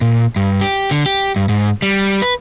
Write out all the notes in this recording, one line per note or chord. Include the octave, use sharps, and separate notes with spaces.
A#2
G2
G4
D3
G4
G2
G#2
G3
B4